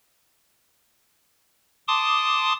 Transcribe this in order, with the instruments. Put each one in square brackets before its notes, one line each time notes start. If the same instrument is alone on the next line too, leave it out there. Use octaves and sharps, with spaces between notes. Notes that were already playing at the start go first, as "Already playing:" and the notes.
[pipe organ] A5 C6 D6 D#6